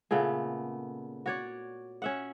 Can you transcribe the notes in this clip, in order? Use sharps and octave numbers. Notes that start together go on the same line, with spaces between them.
A#2 C#3 A3 B3
F#4 C#5 D5
C#4 E5 F#5